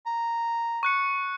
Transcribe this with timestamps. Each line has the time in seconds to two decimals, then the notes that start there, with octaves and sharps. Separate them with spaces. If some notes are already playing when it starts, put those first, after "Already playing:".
0.06 A#5
0.83 C#6 F#6 C#7